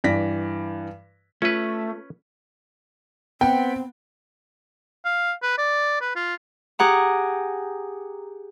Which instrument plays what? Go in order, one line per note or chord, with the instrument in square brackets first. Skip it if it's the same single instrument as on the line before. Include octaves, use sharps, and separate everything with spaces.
[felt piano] G2 E3 D5 A#6 B6
[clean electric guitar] A3 [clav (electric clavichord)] C#4 B4 [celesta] F4
[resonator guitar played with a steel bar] B3 [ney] C4 [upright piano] G5
[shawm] F5
B4
D5
B4
F4
[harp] G4 G#4 F#5 A#5